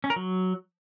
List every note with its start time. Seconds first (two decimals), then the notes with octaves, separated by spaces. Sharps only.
0.04 C#4
0.10 A#4
0.16 F#3